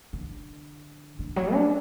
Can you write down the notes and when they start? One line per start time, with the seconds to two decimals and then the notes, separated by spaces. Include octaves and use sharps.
0.13 D3
1.19 D3
1.36 F#3
1.54 D4